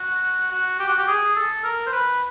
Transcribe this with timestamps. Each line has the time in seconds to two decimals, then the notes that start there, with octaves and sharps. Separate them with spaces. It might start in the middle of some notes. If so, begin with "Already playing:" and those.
Already playing: F#4
0.52 F#4
0.80 G4
0.88 F#4
0.99 G4
1.08 G#4
1.36 A4
1.64 A#4
1.87 C5
1.92 B4